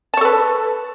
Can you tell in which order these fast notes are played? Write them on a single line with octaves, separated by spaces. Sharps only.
A5 C#5 A4 B4